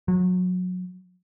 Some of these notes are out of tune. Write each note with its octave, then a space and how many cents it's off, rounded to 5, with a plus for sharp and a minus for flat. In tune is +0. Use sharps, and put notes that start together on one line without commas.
F#3 -25